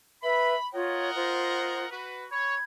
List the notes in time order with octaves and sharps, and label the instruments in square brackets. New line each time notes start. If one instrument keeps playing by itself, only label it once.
[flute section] B4 E5 [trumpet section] B5
[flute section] F4 C#5 [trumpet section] A#4 D#5 F#5
[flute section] F4 C5
[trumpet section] F#4 B4
[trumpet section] C#5 [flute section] B5 G#6